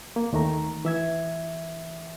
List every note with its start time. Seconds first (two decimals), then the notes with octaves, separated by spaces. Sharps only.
0.16 A#3
0.33 D#2 D#3 A3 A#5
0.85 E3 E5 G#6